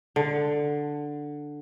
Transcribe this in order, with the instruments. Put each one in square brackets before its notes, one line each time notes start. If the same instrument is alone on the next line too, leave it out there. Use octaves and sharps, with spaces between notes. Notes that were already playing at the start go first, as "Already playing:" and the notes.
[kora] D3